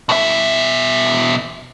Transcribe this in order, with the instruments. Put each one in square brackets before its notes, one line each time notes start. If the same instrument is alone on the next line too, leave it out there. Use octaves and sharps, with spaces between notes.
[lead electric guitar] B2 E5